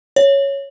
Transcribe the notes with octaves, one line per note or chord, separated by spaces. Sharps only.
C#5